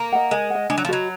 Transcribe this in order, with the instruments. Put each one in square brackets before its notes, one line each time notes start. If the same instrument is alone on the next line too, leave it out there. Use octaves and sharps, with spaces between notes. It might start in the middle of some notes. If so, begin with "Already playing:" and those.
Already playing: [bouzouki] A#3
[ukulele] D#5 F#5
[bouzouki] G#3 [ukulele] A#4
[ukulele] D#5 F#5
[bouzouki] G#3 [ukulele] D4
[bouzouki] F#3
F3
[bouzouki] F#3 [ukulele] F#4 B4 D#5